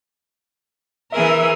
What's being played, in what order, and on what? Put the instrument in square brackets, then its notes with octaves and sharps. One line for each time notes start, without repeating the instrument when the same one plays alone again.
[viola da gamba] E3 G#4 A#4 [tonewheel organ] E5